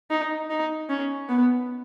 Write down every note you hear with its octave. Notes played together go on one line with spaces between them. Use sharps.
D#4
D#4
C#4
B3